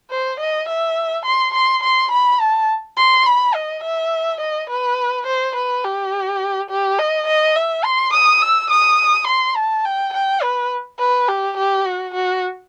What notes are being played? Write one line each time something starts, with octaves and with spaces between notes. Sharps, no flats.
C5
D#5
E5
C6
C6
C6
B5
A5
C6
B5
D#5
E5
D#5
B4
C5
B4
G4
G4
D#5
D#5
E5
C6
D#6
E6
D#6
C6
A5
G5
G5
B4
B4
G4
G4
F#4
F#4